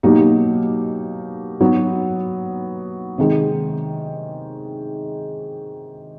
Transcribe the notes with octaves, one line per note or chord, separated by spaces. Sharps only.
B2 F#3 A#3 D#4 G4
F#3 B3 D#4
C3 D#3 G#3